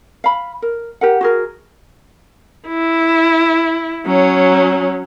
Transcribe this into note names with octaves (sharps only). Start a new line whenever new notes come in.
F5 B5
A#4
G4 A#4 F#5
F#4 G#4 A#4
E4
F#3 C#4